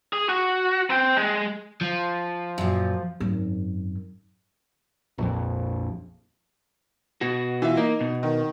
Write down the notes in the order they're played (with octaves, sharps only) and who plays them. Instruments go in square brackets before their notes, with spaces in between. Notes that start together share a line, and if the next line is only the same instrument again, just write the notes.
[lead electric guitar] G#4
F#4
C4 G5
G#3
[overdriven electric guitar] F3
[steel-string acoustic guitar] F#2 A#2
[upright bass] G#1 F#2
[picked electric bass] A#1 F2
[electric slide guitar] B2 F#4
[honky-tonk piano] E3 F4 E5
[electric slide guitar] A#3 [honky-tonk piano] D#4
[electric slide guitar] B2
[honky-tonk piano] D#3